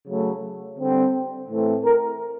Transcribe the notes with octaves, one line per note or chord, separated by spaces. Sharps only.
C#3 F#3 A3
D3 G3 C4
A2 E3 A3 C4
A#4